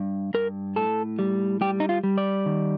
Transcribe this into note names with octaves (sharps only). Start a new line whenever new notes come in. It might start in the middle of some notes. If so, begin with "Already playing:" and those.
Already playing: G2
G2 A#4
A2 A4
G3
G3 G4
D#4
F4
G3
D5
D#3